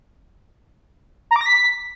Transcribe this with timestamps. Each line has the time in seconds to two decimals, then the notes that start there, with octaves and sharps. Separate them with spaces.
1.31 A#5
1.36 D6
1.41 A#6
1.46 B6